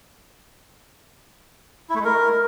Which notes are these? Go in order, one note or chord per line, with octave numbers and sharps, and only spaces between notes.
E4
A3
G#3
A#4